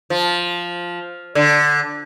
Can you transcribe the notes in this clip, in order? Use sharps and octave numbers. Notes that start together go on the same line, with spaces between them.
F3
D3